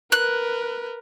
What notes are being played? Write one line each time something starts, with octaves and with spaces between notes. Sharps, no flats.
A#4 B4 F#6